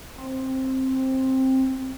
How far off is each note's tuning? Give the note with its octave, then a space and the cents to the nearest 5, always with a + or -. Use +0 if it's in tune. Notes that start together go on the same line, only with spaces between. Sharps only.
C4 +10